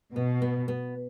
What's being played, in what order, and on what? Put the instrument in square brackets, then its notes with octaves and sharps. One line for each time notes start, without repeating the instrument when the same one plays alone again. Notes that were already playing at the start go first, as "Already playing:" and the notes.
[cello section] B2 [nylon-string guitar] B3
[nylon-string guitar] B3
B3